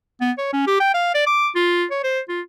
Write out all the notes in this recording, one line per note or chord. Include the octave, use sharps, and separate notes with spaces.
B3
C#5
C#4
G4
G5
F5
D5
D6
F4
C#5
C5
F4